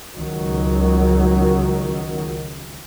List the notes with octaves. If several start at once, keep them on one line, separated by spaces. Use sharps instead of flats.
C#2 D#3 F#3